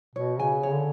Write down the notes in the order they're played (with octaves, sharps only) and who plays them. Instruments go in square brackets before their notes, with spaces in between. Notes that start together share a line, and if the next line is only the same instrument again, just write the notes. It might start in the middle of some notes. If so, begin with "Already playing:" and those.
[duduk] B2 [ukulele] C#5
[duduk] C#3 [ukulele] G#5
[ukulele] C#5
[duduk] D3